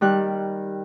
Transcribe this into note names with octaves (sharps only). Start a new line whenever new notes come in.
D#3 G3 F#6